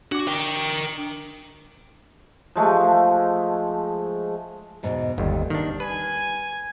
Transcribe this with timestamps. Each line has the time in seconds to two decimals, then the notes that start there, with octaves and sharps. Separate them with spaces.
0.12 D4 F#4 D6
0.27 A#4 G5
2.56 F3 G#3 A3
4.83 E2 G#2 B2
5.18 G1 D#2 G3
5.50 D#3 D4
5.80 B4 G#5